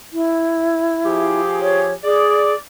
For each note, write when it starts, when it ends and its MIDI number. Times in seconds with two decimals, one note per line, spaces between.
0.13 1.41 64
1.05 1.96 53
1.05 1.96 67
1.05 1.96 68
1.61 1.93 73
2.04 2.54 68
2.04 2.56 74